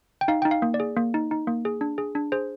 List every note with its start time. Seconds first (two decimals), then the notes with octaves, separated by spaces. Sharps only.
0.21 G5
0.28 D#4 F5
0.42 D#4 G5
0.51 F5
0.62 A#3
0.74 D5
0.80 G#4
0.97 A#3
1.14 D#4
1.31 D#4
1.47 A#3
1.65 G#4
1.81 D4
1.98 G#4
2.15 D4
2.32 G#4 C5